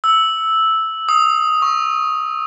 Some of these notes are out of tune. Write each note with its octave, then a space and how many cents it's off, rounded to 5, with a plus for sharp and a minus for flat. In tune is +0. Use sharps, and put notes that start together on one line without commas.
E6 -5
D#6 +10
C#6 +0